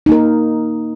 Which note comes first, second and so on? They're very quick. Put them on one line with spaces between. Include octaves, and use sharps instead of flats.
D#4 A#3 A#4